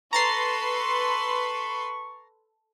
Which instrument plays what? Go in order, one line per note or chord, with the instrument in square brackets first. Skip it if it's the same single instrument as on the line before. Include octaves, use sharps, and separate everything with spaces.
[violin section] A4 B4 C6 [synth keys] A#5 A6 C7 [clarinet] C#6